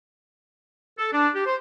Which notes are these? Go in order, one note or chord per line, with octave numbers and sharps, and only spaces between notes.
A4
D4
G4
C5